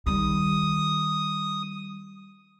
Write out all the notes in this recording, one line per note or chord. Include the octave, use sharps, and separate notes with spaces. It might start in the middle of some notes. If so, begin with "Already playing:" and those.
D#3 G3 D#6